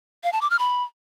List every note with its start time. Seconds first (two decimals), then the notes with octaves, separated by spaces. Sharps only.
0.24 F5
0.33 A5
0.41 D6
0.50 F6
0.59 B5